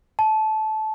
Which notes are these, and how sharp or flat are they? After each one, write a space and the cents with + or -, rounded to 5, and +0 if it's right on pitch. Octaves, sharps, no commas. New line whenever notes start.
A5 -20